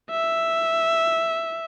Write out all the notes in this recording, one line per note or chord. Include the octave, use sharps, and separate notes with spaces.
E5